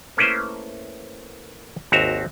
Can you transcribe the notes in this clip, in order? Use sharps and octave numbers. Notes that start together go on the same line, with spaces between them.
A3 A#3 C#4 E4 B4 C5
G#1 D#2 C4 F#4 E5 A#5